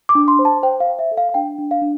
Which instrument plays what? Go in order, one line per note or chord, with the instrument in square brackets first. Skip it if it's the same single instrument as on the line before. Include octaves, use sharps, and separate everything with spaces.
[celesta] D6
D4
C6
C5
A5
C5 G5
F5
C5
E5
A4
F5
F5
D4 G5
D4
F5
D4